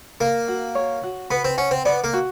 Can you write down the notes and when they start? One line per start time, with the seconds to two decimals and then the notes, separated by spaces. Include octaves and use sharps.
0.21 A#3 A#4
0.48 F#4
0.75 C#5
1.03 F#4
1.30 B3 B4
1.45 C4
1.58 C#4 F#5
1.71 C4
1.85 B3 D5
2.04 A#3
2.13 F#4